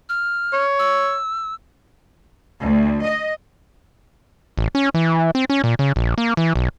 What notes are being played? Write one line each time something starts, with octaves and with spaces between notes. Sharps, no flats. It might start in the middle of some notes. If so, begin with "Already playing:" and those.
F6
C#5
E6
D2
D#5
A1
C#4
E3
C4
C#4
A#2
C#3
A#1
A#3
E3
B1